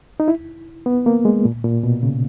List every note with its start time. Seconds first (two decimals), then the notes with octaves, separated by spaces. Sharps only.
0.20 D#4
0.28 E4
0.86 B3
1.06 A#3
1.25 G#3
1.45 A#2
1.64 A#2
1.83 B2
2.03 C#3